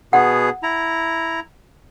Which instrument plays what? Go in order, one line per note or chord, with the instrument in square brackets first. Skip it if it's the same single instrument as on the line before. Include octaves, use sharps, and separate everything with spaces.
[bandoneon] B2 B3 G#4 [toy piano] F#5
[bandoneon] E4 A#5